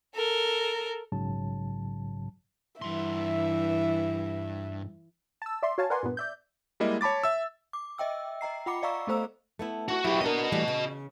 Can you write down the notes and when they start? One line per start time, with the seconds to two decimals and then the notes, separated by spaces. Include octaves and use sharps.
0.15 A4 A#4
1.12 A#1 G#2 C#3 F#3 A5
2.82 G2 E3 E5 C6
5.42 A5 E6
5.63 D5 E5 C6
5.78 F#4 C#5 F5 G#5 A5
5.90 A#4 B4 D5 F#5 G#5 C6
6.03 G2 A#2 B3
6.17 D5 E5 G6
6.80 G3 G#3 A#3 E4 D#5
7.01 C#5 A5 B5 D6 A6
7.24 E5 E6
7.73 D6
7.98 D#5 E5 G5 E6
8.41 D#5 G5 A#5 C7
8.66 F4 F#5 B5 D6 C#7
8.82 D5 D#5 F5 A#5 C#6 E6
9.07 A3 B3 A4 C5 A#5 E6
9.59 A3 B3 E4
9.88 E4 F#4
10.05 F#3 B3 E4 G4
10.21 B3 D4 F#4 A#4 D#5
10.52 E3 G3 A3
10.68 C#3